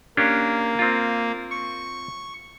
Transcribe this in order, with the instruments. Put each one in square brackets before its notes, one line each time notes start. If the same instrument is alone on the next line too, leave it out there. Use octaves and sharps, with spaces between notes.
[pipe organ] A#3 [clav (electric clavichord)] C#4 D4 G4
[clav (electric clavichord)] C4 F4
[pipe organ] C#6